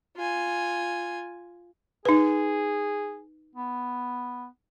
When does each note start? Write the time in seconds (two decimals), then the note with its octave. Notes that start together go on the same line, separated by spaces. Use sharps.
0.17 F4 G#5
2.05 D#4 G#4 B4
3.55 B3